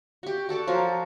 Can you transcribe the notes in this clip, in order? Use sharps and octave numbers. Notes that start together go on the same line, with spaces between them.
F#4 G4
F#4 A4 D5 D6
F3 F#3 A#4